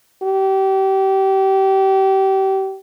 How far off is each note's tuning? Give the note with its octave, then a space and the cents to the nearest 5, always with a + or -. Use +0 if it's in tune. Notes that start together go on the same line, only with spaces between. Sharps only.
G4 -30